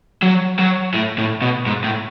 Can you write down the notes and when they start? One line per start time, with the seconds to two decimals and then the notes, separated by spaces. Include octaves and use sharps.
0.22 F#3
0.59 F#3
0.94 A2
1.18 A2
1.42 B2
1.66 G#2
1.84 A2